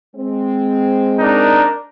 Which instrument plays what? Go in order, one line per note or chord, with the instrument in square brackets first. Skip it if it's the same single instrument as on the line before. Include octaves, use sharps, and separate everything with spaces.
[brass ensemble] G#3 C4
[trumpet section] D4 D#4 A#4